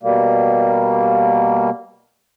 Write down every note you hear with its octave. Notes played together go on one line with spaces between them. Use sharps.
B2 G3 A#3